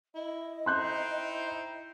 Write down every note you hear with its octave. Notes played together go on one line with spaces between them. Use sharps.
E4 D#5
D#4 E4 C5 G5 C6 F#6 G6